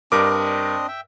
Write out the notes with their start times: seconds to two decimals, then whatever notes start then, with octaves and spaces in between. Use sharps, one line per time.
0.12 G2 C4 D4 A#4 D#5 D6
0.88 E5 G5